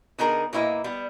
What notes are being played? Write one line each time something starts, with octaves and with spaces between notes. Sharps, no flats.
D3 B3 D#4 G#4 A#4
A#2 A#3 E4 B4 D#5
G3 B3